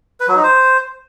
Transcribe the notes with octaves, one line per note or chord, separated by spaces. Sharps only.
B4
F#3
D#4
C5